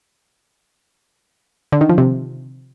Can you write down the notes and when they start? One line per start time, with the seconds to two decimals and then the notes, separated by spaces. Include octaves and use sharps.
1.72 D3
1.81 D#3
1.89 F3
1.98 C3